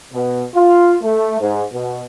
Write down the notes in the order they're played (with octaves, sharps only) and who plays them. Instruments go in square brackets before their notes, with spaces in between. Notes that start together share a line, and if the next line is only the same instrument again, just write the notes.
[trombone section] B2
F4
A3
G#2
B2